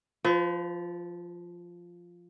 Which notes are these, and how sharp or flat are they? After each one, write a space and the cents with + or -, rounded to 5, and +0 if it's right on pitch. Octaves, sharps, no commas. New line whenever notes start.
F3 +0 B4 +45